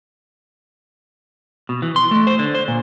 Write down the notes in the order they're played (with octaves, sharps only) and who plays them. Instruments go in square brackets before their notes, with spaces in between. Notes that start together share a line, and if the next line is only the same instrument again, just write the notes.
[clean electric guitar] B2
E3
C6
A3
C5
D3
C5
A#2